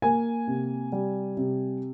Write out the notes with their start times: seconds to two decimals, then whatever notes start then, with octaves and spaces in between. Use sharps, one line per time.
0.02 A#3 G#5
0.47 C3
0.92 G3
1.37 C3